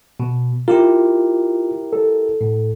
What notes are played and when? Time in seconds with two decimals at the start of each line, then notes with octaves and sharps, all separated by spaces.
0.20 B2
0.68 E4 F4 G4 A#4
1.93 A4
2.41 A2